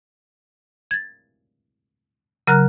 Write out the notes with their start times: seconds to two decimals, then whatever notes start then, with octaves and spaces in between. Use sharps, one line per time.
0.91 G#6 A6
2.47 C#3 F#3 A#4 A#5 F6 F#6